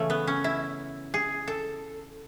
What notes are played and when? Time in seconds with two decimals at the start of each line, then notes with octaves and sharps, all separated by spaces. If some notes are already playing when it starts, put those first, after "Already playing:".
Already playing: C#3 E3 A3 C#4
0.10 B3
0.27 C#4
0.44 E4
1.14 G#4
1.48 A4